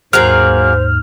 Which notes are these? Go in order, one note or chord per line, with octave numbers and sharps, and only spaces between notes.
D#2 G#2 F#3 A#3 G#4 C5 F6